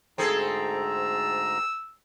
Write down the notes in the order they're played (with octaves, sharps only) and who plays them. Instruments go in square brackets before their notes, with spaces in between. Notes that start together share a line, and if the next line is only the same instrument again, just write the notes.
[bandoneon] D2 G#2 A#5 [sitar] C4 G#4 A4
[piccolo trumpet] E6